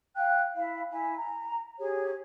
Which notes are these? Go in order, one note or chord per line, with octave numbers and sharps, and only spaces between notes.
F5 G5 F#6
E4 F5
E4 G#5
A#5
G4 G#4 C#5